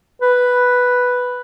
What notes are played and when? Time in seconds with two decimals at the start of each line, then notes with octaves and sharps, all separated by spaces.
0.22 B4